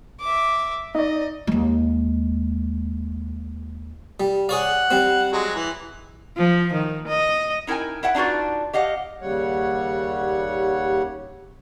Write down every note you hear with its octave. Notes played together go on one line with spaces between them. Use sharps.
E5 D6
D#4 D5 D#5
D#2 G#3
G3
G#4 C#5 D5 F#5
G3 C4
F#3 G#3
E3
F3
D#3
D#5
D#4 E4 A#4 G5 G#5
E4 E5 F#5
D4 D#4 F4 F#4 B4
G4 D#5 F5 F#5
D#2 C#3 G3 C#5 F#5